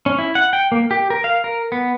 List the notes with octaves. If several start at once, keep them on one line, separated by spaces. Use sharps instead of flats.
C#4
E4
F#5
G5
A#3
G4
A#4
F5
A#4
B3